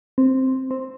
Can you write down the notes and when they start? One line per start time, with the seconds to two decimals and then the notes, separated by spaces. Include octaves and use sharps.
0.18 C4
0.71 C4